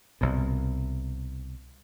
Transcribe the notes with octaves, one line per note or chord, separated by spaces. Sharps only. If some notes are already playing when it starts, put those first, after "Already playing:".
C2 B2